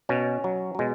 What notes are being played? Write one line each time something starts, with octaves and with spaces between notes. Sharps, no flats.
B2 C#4
F#3
F#3
B2 G#3